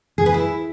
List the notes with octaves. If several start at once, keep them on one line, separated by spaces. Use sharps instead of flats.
G#4
B4
E4